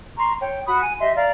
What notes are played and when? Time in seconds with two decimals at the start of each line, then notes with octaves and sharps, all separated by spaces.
0.18 A#5 C6 C#6
0.41 C#5 G5
0.66 F#4 B5 D#6
0.82 G#5
1.00 G4 D#5 E5 C6
1.16 D5 F5 A#5